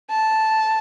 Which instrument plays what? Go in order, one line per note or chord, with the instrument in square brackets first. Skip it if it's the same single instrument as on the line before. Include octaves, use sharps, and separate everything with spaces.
[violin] A5